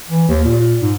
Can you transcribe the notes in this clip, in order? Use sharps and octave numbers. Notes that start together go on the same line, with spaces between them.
E3
D#2
A#2
G#2